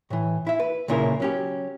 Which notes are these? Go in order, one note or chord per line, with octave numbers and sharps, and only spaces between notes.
A2 E3
E4 E5
B4
B1 A#2 C#3 E4 G4 A#4
F#3 C#4 G4